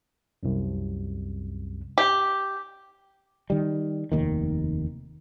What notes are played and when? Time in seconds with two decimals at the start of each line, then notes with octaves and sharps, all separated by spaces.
0.43 C2 F#2
1.98 G4
3.50 D#3 G3
4.12 F1 D#2 D#3